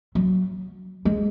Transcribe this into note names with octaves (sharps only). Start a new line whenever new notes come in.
F#3
G#3